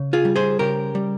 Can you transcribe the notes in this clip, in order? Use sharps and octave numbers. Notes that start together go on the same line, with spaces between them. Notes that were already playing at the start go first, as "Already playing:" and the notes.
Already playing: C#3
F4 G#4
G3
G#4 C5
C#3 G4 A#4
G3